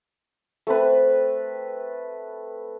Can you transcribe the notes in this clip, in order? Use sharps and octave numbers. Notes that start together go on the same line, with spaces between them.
A3 C4 B4